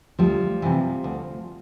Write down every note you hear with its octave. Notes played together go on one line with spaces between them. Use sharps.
D2 F3 G3
C3 E3
D2